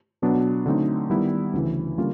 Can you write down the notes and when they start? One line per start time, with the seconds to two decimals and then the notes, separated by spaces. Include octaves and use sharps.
0.22 B2 F#3 B3 D4
0.66 D3 F#3 A3 C4 D#4
1.10 D#3 G3 B3 E4
1.53 D2 C#3 E3
1.97 D3 G3 A#3 C#4 F4